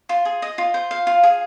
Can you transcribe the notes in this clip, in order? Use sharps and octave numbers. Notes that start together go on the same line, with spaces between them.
F4
G#4
D#5
F4
C5
F5
F4
G#4